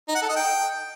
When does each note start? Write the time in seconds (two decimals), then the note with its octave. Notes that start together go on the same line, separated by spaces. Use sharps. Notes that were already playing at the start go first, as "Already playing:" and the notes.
0.08 D#4
0.15 F#5
0.22 A4
0.29 D#5
0.36 G5